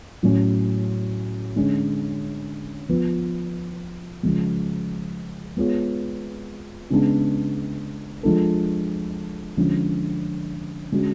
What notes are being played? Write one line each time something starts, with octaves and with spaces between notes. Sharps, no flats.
A2 F#3 C#4 F#4
D3 G#3 C#4
F3 B3 F4 B4
C#3 F3 G#3
G#3 B3 F4 G#4 C#5
C#3 G#3 B3 D4
F3 G#3 D4 F4 A4
D3 F3 G#3 C#4
D3 G#3 C#4 F#4